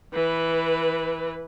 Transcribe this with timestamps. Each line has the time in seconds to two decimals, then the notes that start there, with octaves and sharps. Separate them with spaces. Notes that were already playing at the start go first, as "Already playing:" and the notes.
0.14 E3 B4